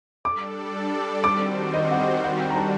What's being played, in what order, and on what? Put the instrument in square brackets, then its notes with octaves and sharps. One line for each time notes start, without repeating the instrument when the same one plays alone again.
[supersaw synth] G3 D4 A4 D5 [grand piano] D6
[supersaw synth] D#3 G3 C4 F#4 C5 [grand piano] D6
[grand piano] D#5
F#5
D#5
[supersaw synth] D#3 G3 D4 F#4 [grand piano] F#5
[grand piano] G5
A#5
A5